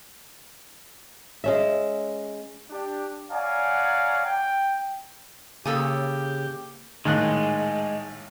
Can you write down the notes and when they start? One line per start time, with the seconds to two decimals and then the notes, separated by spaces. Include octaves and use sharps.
1.44 G#3 C#4 E5
2.70 D4 G4
3.31 C#5 D5 F5 F#5 G#5 A#5
4.26 G5
5.66 C#3 A#3 G4 A4 A#4 G#5 D#6 E6
7.05 A#1 A2 D#3 G#3 F#6